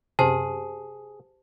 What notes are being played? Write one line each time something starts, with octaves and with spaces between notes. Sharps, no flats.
F#2 C3 G4 G#4 C5 A5